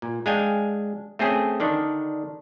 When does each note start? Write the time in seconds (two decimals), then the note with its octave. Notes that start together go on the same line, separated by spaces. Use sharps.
0.02 A#2
0.26 G#3 D4 F5 G5 G#5
1.19 A3 C4 C#4 G#4
1.60 D3 D#3 D4